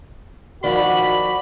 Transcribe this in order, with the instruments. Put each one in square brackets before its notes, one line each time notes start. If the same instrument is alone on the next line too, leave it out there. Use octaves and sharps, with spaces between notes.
[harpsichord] D#3 F3 [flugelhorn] F#4 [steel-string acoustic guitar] D5 [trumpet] B5